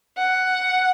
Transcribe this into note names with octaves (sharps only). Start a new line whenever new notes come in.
F#5